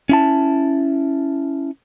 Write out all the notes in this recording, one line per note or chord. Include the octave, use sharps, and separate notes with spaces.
C#4 E4 A5